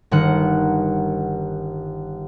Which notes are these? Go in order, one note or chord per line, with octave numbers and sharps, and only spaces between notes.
G1 D#3 F#5